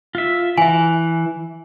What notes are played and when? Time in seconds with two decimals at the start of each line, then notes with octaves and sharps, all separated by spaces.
0.15 F4 E5
0.58 E3 E5 G#5